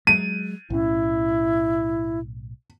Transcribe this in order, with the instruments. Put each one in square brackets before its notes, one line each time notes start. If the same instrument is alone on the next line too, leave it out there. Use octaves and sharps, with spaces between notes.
[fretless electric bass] F#3 G#3 [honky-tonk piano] D#7
[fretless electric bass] B1 A2 C#4 [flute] E4